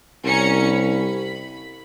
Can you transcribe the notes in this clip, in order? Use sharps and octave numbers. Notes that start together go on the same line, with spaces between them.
C2 C#4 A#5 C#7
B5